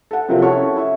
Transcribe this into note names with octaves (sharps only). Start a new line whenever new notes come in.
A4 F#5
C3 F3 F#3 C4 F4 A#4
C#4 E4 A4 C#5 F#5 C#6
E4 E5